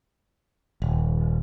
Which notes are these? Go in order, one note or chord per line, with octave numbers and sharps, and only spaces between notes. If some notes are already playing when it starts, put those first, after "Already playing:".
D#1